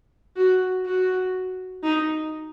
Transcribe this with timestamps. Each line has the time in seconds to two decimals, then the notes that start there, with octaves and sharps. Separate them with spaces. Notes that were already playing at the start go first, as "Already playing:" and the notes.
0.37 F#4
0.85 F#4
1.83 D#4